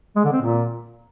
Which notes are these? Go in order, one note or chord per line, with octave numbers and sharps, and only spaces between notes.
G#3
D3
C4
A#2